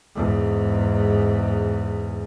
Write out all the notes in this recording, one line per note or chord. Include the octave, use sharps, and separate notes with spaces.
E2 G#2